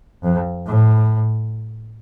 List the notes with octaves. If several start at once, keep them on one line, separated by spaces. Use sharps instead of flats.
F2
A2